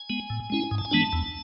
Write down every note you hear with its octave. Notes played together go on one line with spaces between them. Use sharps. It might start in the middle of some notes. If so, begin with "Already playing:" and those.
Already playing: G#5
G#3 B3
A2
G#3 C#4 E4
G#2
A5
G#5
E3 G#3 B3 D4 A5
E2